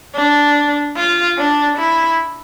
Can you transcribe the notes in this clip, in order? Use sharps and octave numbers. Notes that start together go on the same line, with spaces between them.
D4
F4
D4
E4